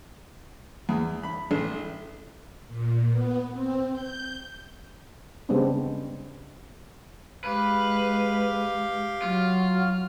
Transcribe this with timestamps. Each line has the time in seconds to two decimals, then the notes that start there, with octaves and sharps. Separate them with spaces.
0.89 E2
1.23 B5
1.51 A1
2.67 A#2
3.11 B3
3.51 C4
3.92 G6
5.49 C#3 G3 G#3 B3 C4 D4
7.44 G#3 G4 B4 F5
9.22 F#3 F4